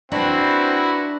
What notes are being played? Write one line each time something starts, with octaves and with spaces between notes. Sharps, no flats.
C4 D4 E4 F#4 B4 A#5